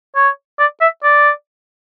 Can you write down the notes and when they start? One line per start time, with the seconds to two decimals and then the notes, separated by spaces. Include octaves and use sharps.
0.15 C#5
0.59 D5
0.81 E5
1.03 D5